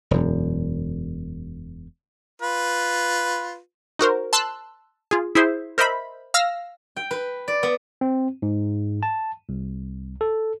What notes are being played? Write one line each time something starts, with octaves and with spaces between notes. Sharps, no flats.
E1 F#2
F4 B4
D#4 F#4 A#4 C5
A5 C6 E6 F#6
F4 G#4
E4 G#4 C5 E5
A#4 C5 D#5 E5 B5
F5 E6 F6 A#6
G5
B4
D5
B3
C4
G#2
A5
C2
A4